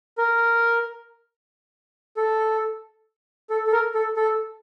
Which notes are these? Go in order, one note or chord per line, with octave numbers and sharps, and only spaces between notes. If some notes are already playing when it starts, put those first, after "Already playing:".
A#4
A4
A4
A4
A#4
A4
A4